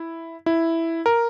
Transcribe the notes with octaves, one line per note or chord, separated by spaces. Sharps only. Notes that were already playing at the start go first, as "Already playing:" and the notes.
Already playing: E4
E4
A#4